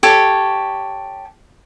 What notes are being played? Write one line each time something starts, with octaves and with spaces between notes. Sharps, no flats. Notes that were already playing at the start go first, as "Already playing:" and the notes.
G4 A4 C#5